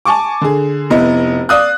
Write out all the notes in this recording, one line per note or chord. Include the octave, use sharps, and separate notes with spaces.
G#5 A5 C#6 D6
D3 G#4
F1 B3 E4 D#5
D5 F5 D#6 F#6